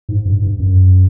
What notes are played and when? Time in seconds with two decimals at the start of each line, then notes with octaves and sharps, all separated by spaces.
0.09 G#2
0.25 G2
0.42 G2
0.60 F#2